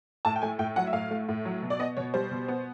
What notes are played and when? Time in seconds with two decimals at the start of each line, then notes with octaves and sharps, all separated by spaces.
0.25 A2 A5
0.36 G5
0.42 A3 G#5
0.59 A2 G5
0.76 F#3 F#5
0.87 E5
0.93 A2 F5
1.11 A3
1.29 A2
1.45 F#3
1.62 B2
1.70 D5
1.79 B3 D#5
1.97 B2 C#5
2.14 G3 C5
2.31 B2
2.48 B3